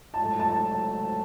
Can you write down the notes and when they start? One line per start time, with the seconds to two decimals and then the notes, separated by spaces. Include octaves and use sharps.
0.14 A5
0.19 G#2 F#3 A3
0.39 A5